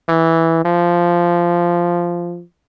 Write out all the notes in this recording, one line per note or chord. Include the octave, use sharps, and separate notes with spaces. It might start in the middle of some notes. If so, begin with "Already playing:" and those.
E3
F3